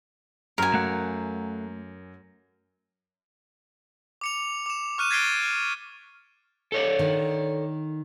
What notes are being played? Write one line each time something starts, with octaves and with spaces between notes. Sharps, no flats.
F#2 A#4 G#5
A3 F5 F#5
D6 C#7 F7
D6 E7
C#6 F6 F#6 D#7 E7
G#6 A6 B6 C7 D7 G7
F6
A4 C#5 D5
D#3